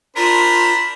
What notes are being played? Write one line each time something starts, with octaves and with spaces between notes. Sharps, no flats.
D4 F4 A#4 C5 B5